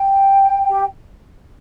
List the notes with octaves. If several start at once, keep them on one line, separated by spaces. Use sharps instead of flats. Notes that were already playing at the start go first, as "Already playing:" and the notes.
Already playing: G5
G4